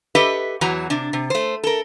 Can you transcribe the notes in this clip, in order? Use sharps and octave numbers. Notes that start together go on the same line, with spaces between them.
G4 A4 B4 D#5 E5
E2 E3 F#3 F#4 A#5
C3 D4
C3
A3 C5
A4 A#4